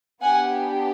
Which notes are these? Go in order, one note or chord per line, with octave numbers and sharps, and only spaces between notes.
B3 D4 G4 F#5 G#5